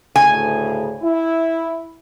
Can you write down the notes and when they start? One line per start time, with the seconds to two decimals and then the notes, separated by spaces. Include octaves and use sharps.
0.16 D2 A2 C#3 G#5
1.02 E4